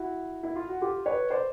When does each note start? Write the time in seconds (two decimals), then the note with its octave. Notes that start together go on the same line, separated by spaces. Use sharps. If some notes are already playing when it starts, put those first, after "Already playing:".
Already playing: E4 F#4
0.43 E4
0.56 F4
0.69 F#4
0.81 F4 G4
1.06 B4 C#5
1.30 C5 D5